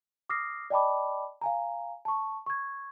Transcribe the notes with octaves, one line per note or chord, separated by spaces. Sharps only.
D6 D#6 F6 A#6 C7
D5 D#5 G5 A5 B5 D6
F5 G#5 A#5
A5 C#6
C#6 G#6